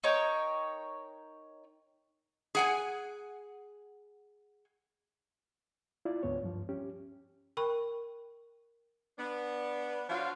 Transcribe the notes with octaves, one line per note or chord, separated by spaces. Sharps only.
D#4 A#4 C#5 G5
G#4 F#5 G#5
E4 F4 D5
D2 G#2 B3 C#5
G2 F3
C#4 G4
A#4 G5 B5 C#6
B3 D4
F3 D4 F4 F#4 C#5 F5